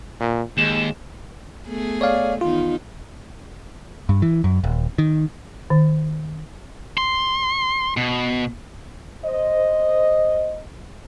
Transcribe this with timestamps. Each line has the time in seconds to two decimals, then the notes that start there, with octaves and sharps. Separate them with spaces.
0.20 A#2
0.58 D#2 G#3 E7
1.68 A3 B3 G#4
2.01 C#5 D5 F5
2.41 E2 D#3 D#4 F4
4.09 G2
4.22 E3
4.44 F#2
4.64 D#1
4.98 D#3
5.70 D#3
6.98 C6
7.97 B2
9.25 C5 D#5